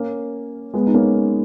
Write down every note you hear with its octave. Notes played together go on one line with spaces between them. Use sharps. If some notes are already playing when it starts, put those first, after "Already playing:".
Already playing: A#3 C#4
G#3 B3
D#4
A#3 C#4